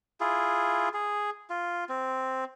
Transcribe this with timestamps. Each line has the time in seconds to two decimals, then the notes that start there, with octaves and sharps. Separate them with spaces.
0.20 E4 F4 G#4
0.94 G#4
1.50 F4
1.89 C4